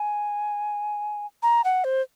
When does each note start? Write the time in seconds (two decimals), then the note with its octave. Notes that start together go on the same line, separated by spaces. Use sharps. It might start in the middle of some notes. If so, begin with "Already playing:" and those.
Already playing: G#5
1.43 A#5
1.64 F#5
1.84 C5